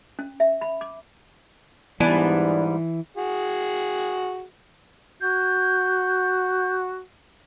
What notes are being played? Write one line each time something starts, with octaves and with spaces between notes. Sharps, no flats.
C#4
E5
B5
D6
G#2 E3 G3 B3 D4 G#5
F#4 G#4
F#4 G6